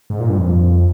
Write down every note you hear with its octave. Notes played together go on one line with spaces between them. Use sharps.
G#2
A#2
G2
F2